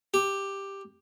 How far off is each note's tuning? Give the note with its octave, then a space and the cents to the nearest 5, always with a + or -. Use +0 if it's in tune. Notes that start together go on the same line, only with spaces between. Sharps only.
G4 +5